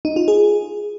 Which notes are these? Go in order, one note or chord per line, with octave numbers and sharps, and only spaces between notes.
D#4
F4
G#4